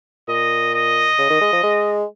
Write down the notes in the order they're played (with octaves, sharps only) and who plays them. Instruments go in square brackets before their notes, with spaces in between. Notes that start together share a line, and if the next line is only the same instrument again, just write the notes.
[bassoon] A#2 [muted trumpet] D#5
[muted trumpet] D#5
[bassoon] C#3
D#3
G#3
F3
G#3